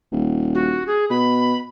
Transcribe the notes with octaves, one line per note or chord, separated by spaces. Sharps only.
D#1
F#4
G#4
B2 B5